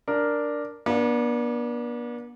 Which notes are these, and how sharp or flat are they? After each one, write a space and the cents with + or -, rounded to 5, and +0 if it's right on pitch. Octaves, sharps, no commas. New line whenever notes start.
D4 +0 A#4 +0
B3 -45 D4 +0